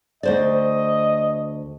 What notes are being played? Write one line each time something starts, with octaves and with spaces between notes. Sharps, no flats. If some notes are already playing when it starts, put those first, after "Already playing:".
D2 C5 D5 D#5